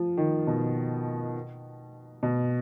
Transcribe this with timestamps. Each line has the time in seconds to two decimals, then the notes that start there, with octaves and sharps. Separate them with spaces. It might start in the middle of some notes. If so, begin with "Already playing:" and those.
Already playing: F3
0.17 D#3
0.47 B2
2.23 B2